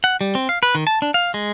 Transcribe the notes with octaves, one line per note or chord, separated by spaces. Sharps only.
F#5
G3
C4
F5
B4
D#3
A5
D4
F5
G#3